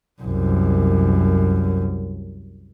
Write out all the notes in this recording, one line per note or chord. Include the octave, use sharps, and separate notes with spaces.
C2 F#2